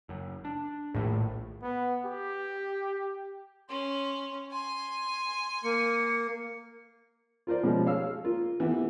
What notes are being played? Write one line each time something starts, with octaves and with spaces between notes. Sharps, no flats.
F#1 F#2
D4
E1 A#1 A2 D#3 A3
B3
G4
C#4 C6
G#5 C6
A#3 C#7
F4 A#4 C5 D5
B2 F3 G3 G#3 C#4
C#5 F5 E6 F6
A#3 F4
E3 B3 G4